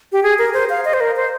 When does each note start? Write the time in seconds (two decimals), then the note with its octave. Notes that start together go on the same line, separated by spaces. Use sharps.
0.12 G4
0.23 G#4
0.39 A#4
0.54 C5
0.70 F5
0.85 D#5
0.94 C5
1.01 A#4
1.16 C5